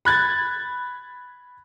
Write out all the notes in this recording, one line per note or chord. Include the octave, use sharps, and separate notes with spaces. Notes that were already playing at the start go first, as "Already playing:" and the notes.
B5 F#6 G#6 A6